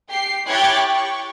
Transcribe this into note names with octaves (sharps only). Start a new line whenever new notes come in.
G4 C7
E4 G4 C#5 F#6 G#6 A6
C#6